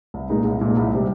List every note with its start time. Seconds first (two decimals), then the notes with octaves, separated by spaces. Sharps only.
0.14 C2
0.30 A#2 G#3 D#4
0.45 C2
0.61 A#2 G#3 D#4
0.76 C2
0.93 C3 G3